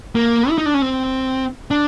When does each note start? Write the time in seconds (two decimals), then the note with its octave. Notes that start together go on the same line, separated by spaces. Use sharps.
0.15 A#3
0.50 E4
0.58 D#4
0.66 D4
0.74 C#4
0.82 C4
1.71 D4